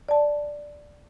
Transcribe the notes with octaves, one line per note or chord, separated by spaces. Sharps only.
D5 A5